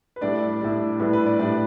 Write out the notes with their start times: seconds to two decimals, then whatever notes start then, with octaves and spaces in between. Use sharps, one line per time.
0.16 B4
0.21 A2 G3 D4 D5
0.61 A2 G3 D4
1.00 A2 G3 D4 B4
1.13 B4
1.26 D5
1.39 A2 G3 D4 D5